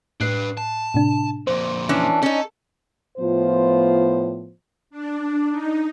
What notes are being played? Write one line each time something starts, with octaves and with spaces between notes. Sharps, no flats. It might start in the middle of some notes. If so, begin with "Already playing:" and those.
A2 D4 B4 F#6 C7
A5
A2 C3 D4
F2 A#2 C5
E3 C#4 D4
C#4 D#4 A4
A2 F3 B3 F4 C5
D4
D#4